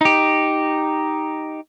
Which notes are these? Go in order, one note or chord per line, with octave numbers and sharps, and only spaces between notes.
D#4 G4